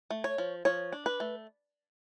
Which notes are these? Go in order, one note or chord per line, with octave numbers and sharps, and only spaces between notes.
A3
C#5
F3
F3 C#5
D4
B4
A3